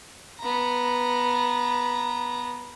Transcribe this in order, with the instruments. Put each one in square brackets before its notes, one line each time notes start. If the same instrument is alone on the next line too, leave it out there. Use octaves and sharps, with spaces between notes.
[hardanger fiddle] B3 A#5